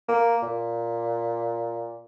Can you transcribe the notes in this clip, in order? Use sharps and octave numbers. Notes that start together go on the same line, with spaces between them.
A#3
A#2